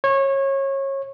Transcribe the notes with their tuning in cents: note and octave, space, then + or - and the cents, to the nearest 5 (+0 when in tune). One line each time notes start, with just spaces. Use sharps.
C#5 -25